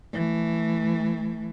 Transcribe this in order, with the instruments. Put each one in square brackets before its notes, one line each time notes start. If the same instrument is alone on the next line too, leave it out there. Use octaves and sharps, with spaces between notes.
[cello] E3 A3